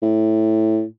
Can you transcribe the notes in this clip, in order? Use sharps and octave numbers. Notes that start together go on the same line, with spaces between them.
A2